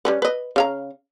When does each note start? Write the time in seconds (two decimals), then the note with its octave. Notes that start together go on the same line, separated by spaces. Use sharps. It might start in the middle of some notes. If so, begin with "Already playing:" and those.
0.05 G3 C#4 B4
0.22 B4 D#5
0.56 C#3 F5 A#5